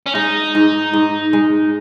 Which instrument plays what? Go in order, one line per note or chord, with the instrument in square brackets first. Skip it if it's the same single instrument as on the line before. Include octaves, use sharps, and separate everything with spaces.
[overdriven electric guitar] C#4
[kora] G#3 [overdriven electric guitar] D#4
[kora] G#2
G#2
G#3